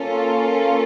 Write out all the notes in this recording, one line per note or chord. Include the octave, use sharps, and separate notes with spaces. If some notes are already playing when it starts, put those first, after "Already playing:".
Already playing: A#3 C#4 F4 A4